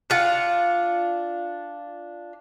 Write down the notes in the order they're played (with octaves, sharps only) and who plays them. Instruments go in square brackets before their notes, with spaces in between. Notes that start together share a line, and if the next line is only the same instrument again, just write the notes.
[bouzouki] D4 F4 F#5